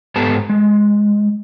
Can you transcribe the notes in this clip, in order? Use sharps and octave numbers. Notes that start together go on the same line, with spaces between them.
G#2 B3 G4 A4 A5 A#5
G#3